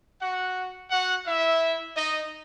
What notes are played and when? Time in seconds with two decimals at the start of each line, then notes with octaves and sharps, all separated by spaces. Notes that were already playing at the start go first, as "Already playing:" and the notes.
0.21 F#4 F#5
0.90 F#4 F#5
1.25 E4 E5
1.95 D#4 D#5